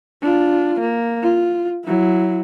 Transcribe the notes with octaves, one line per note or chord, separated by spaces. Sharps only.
D4 F4
A#3
F4
F#3 E4